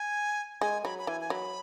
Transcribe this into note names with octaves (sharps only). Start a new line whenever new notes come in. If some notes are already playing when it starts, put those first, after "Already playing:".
Already playing: G#5
G#3 G#5
F#3 B5
B5
E3 G#5
G#5
F#3 B5